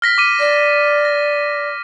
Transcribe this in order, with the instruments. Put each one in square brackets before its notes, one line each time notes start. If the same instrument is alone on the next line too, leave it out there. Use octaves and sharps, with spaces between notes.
[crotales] F6 A#6 B6
D6 F6 D#7
[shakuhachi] D5
[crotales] A#6